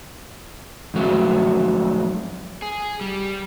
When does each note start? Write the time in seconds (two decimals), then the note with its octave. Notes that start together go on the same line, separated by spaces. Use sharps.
0.94 F2 G#2 F#3 A3
2.62 G#4
3.01 G3